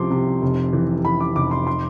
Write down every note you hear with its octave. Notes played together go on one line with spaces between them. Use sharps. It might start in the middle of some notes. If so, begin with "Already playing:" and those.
Already playing: C2 C3 F3 C6 D6
C3
F1
E3
E3 B5
D6
F1 D6
C6
C6